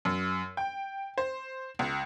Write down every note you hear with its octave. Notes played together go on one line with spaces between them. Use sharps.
F#2
G5
C5
C#2